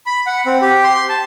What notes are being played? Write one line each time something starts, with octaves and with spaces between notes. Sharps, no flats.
B5
F#5
C4
G4
C6
A5